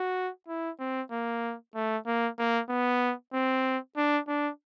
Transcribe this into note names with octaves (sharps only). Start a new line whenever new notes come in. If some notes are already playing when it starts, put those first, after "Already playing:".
Already playing: F#4
E4
C4
A#3
A3
A#3
A#3
B3
C4
D4
D4